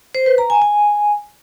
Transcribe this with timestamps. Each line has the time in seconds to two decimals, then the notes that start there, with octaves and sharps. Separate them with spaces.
0.15 C5
0.26 B4
0.38 A#5
0.50 G#5
0.62 G#5